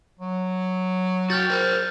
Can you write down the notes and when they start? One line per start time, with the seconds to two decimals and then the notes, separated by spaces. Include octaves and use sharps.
0.19 F#3
1.30 F#4 G5 F6 G6 A6
1.50 A#4 C5